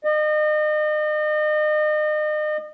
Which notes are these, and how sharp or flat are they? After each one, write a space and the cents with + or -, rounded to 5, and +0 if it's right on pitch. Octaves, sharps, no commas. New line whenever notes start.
D#5 -35